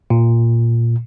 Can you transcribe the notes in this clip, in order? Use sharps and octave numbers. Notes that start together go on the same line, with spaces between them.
A#2